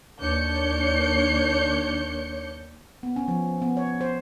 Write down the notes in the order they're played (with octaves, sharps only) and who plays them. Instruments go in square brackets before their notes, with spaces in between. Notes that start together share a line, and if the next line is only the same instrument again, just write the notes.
[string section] D#2 D4 C#5 G6 C#7
[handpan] B3
C#4
F3
B3
C#5
C5